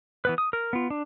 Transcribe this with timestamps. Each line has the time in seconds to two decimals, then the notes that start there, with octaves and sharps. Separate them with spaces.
0.25 E3 B3 B4
0.38 D#6
0.53 A#4
0.73 B3 F4
0.90 D4